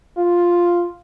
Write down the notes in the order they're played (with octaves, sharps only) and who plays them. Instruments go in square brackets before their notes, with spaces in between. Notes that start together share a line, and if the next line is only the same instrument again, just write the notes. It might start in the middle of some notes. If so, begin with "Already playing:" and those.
[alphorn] F4